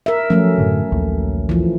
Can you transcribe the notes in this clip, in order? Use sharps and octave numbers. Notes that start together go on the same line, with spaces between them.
A#4 E5
F3 F#3 A3 C#4
F#2 A2 D3
A#1 D#2
E3 F3